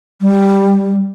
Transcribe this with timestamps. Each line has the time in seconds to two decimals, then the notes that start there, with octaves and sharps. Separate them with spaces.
0.22 G3